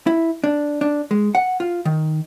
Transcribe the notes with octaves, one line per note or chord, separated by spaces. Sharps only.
E4
D4
D4
G#3
F#5
F4
D#3